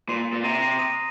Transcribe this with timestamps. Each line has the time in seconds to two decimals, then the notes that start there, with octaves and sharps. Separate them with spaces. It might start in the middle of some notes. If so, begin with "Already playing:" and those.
0.09 A#2 C6 C7
0.33 A#2
0.43 C3 A#5 A#6
0.61 C6 C7
0.79 D#6 D#7